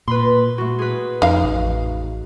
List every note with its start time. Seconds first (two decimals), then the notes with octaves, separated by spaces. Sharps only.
0.08 A#2 B4 B5 C6
0.58 A3 F#4
0.79 G#4 B4
1.22 F2 D#4 F5
1.44 A1